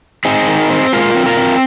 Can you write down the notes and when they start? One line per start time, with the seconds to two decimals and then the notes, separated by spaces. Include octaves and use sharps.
0.25 C4 D#4 G#4
0.48 D#3
0.70 C4
0.92 G#3 F4 A#4
1.14 C4
1.26 F4 A#4
1.37 C4